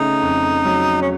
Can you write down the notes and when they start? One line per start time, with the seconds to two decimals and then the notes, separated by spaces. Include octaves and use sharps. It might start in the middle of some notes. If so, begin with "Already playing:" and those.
Already playing: C#3 A3 D#4
0.22 F2
0.65 F#3
1.02 C#4